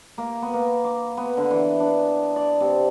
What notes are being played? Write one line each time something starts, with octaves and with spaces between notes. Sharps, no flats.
A#3
B3
A#3
D6
B3
D3
E3
D4
D5
C3